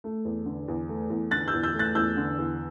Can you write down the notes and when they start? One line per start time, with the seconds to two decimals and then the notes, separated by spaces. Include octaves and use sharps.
0.04 A3
0.25 E2
0.46 D3
0.68 E2
0.89 A3
1.10 E2
1.31 D3 F#6 A6
1.48 E6 G6
1.53 E2
1.63 E6 G6
1.74 A3
1.79 F#6 A6
1.95 E2 E6 G6
2.17 D3
2.38 E2